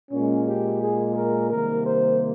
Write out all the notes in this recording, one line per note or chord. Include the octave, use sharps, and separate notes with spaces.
A#2 G#3 C#4
G4
G#4
A#4
C3 D#3 G3 A#3 A#4
C5